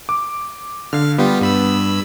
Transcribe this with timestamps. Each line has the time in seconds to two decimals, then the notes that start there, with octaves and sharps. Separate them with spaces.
0.09 D6
0.93 D3 F5 F6
1.18 G3 B3 F4 G4
1.41 G2 B5 E6